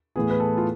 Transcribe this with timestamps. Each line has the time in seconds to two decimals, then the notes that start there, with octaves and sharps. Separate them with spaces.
0.16 A2 E3 B3 G#4
0.30 B4
0.40 A4
0.57 F4